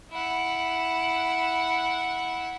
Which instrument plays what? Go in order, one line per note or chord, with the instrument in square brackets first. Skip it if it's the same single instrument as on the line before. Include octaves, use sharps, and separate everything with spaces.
[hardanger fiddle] E4 F#5